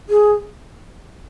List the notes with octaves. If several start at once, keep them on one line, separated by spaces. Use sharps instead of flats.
G#4